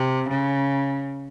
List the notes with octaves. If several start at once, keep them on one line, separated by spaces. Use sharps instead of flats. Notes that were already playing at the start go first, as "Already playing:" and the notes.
Already playing: C3
C#3